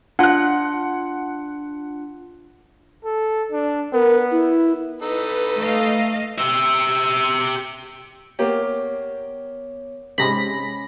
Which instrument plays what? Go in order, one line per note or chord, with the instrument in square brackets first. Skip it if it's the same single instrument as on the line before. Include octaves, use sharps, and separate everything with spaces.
[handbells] D4 F4 [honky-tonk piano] F#5 F#6
[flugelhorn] A4
D4
[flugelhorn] B3 [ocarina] A#4
[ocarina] E4
[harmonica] D#4 A4 [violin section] B4
[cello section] A3 D#5 F5
[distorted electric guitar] G4 E5
[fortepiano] A#3 G4 [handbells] B3 C#5
[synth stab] G#2 C3 G#3 [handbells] C#4 [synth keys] B5 A#6 B6